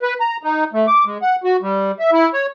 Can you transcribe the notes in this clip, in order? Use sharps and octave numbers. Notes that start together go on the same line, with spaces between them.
B4
A#5
D#4
A3
D6
G#3
F#5
F#4
G3
E5
E4
C#5